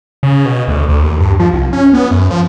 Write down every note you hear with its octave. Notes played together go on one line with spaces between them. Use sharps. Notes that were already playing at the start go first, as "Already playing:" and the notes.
C#3
B2
D2
D2
D#2
G2
F3
C2
C#4
B3
F#2
F3